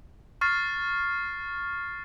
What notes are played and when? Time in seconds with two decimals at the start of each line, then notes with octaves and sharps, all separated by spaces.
0.41 C#6 F6 A6 C7